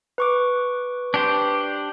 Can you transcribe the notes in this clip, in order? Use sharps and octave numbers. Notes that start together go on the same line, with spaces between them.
B4 C#6 D6
D4 G4 C5